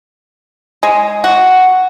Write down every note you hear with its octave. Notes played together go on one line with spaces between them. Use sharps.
G#3
F#4